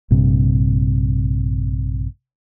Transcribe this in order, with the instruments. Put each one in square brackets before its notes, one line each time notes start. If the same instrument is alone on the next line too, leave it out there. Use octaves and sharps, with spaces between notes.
[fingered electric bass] A#1 G2 C3